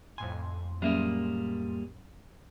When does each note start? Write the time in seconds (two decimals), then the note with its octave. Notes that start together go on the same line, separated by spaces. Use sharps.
0.18 F2 A2 G#5 C6
0.82 F#3 G3 A#3 C#4 G#4 E5